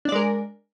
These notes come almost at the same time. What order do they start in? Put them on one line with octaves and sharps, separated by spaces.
D4 D5 G#3 A#4